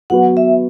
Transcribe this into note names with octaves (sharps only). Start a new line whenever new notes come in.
F#3 B3 F#4 B4 F#5
E5